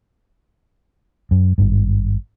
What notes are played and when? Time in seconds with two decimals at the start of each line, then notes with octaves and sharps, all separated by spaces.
1.31 F#2
1.58 G#1 G2